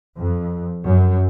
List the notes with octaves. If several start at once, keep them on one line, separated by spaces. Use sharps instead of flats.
F2
F#2